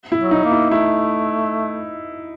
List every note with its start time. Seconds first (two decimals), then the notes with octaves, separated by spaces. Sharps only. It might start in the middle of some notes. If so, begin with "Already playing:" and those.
0.12 E4
0.18 F#3
0.31 D#4
0.44 A#3
0.51 E4
0.71 A3 E4